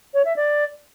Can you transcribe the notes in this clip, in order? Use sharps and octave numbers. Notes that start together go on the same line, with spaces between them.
C#5
E5
D5